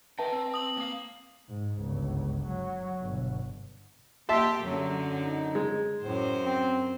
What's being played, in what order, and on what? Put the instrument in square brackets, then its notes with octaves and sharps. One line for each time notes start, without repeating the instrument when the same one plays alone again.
[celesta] B4 E5 A5 [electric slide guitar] G5 A#5
[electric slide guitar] C4
[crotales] D#6 F#7
[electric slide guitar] A#3 F5
[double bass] G#2
G1 C#2
F#3
G1 B2
[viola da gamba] A#3 G4 [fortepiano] E5 A5 C6
[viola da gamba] F#2 D3 [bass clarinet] F#3
[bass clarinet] D#4
[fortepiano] G#3
[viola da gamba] F#2 C5 [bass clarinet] A2
[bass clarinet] C4